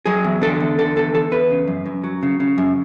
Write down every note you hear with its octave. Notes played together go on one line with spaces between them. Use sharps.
F#3 G#4
E2
D3 A4
E2
D3 A4
E2 A4
E2 A4
E2 B4
C#3
F#2
F#2
F#3
C#3
C#3
F#2